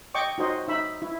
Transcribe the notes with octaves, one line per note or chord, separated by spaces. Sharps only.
D#5 G5 C#6 D6
D#4 F#4 C5 D#5
D#4 E5 B5
E4